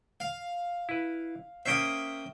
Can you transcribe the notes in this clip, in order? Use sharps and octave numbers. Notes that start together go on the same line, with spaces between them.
F5
E4 B4
A#3 C#4 C5 E5 G5 D#6